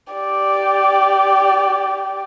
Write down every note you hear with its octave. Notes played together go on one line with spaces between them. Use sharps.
G4 D5